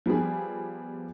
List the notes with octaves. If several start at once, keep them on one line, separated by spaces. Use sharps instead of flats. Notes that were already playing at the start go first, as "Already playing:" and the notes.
F3 G3 B3 G#4